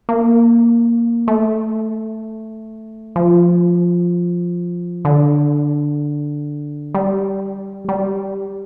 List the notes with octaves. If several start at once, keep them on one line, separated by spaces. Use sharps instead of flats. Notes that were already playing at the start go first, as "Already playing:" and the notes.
A#3
A3
F3
D3
G3
G3